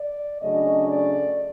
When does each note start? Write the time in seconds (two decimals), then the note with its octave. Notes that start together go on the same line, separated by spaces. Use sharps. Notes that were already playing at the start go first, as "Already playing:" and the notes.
Already playing: D5
0.41 C#3 F#3 A3 D4 D#5
0.89 D5